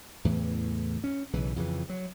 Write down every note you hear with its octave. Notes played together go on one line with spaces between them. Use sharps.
E2 A2 C#3 E3
C#4
B1 C#3 E3
F2 C#3 E3
F#3